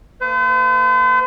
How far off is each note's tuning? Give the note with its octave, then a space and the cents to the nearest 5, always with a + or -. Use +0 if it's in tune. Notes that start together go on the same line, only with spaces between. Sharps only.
A#3 -30 C5 -45